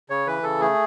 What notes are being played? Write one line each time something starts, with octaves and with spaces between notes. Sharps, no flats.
C#3 C#5
E3 B4
C#3 A4
A3 G#4